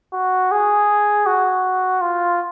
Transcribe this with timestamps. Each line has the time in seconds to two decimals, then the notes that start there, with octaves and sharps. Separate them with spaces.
0.13 F#4
0.52 G#4
1.27 F#4
2.01 F4